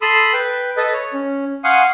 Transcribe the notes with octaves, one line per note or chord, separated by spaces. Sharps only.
A4 B5 C6 D#6 E6
B4 G5
A4 B4 D#5
C#5
C#4
F5 F#5 G#5 C6 C#6 D#6